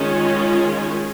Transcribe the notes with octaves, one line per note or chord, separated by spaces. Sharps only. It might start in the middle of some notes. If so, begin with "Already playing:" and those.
Already playing: D#3 G#3 C#4 F4